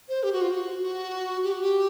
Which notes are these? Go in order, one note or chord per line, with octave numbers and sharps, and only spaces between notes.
C5
G4
F#4
F4
F#4
F#4
G4
F#4
G4